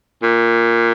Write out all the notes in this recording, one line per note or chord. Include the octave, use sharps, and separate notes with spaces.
A#2